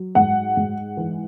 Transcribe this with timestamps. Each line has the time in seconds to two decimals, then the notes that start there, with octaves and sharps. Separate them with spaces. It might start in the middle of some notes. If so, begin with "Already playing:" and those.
Already playing: F#3
0.15 G#2 F#5
0.57 G#2
0.97 E3